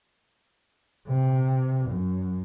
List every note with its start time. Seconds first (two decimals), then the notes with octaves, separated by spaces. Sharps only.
1.08 C3
1.90 F#2